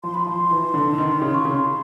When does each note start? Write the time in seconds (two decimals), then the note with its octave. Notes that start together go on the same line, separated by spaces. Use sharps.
0.03 F3 C6
0.14 B5
0.25 F3 C6
0.51 E3
0.74 D3
0.93 D3
0.98 D#3
1.22 C#3
1.34 C#6
1.45 C#3 C6